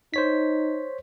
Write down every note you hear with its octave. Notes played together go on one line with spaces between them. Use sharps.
D#4 C5 C#5 B6